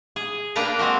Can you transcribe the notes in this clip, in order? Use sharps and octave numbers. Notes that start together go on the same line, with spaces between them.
G#4
A#3 D4 B4 G5 A#5
G#3 C4 F#4 A#4